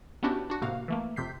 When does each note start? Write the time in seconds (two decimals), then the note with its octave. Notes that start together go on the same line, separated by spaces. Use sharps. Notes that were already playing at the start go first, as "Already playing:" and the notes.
0.23 B3 C#4 D4 E4 F#4 G4
0.50 D4 F#4
0.62 A2 C3 A#3 F#4 F5
0.88 E3 A3 A#3
1.16 F2 C3 G6 B6 C7